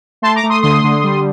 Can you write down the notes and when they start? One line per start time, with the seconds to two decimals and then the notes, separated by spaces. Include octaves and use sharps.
0.22 A3 A5 C6
0.36 A#5 D6
0.43 A3
0.50 C6 D#6
0.62 D3 C6 D#6
0.84 D3
1.03 G3